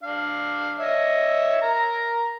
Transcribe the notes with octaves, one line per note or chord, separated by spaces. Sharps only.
D4 F5
C#5 D#5 E5
A#4 A#5